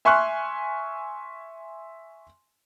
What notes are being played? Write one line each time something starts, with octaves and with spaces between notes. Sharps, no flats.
E5 G#5 C6 C#6 F6 F#6